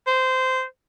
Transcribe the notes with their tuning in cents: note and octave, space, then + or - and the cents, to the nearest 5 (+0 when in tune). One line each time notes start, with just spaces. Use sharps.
C5 -15